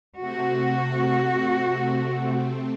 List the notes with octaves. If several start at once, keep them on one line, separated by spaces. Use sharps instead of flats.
C3 A3 C4 F#4